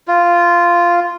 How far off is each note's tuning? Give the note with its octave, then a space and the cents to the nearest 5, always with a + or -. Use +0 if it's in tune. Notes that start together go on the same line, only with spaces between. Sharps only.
F4 -10